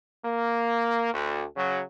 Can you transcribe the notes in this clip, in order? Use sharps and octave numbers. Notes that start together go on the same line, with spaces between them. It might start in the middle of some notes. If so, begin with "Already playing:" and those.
A#3
D2
C#3 F#3